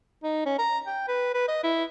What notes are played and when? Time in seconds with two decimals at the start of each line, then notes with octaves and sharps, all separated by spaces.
0.23 D#4
0.46 C#4
0.58 A#5
0.87 G5
1.08 B4
1.34 B4
1.48 D#5
1.64 E4